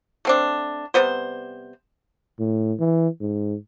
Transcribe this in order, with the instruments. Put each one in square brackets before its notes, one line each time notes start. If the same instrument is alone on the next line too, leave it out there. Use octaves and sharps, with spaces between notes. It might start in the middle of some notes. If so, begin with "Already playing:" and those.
[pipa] A3 C4 D4
C3 G3 B3 C5
[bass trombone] A2
E3
G#2